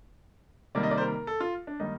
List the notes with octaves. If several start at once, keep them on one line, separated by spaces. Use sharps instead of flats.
C3 D#3 G3 A#3 D5
D#5
D5
C5
A#4
A4
F4
D4
D#3 G3 A#3 D#4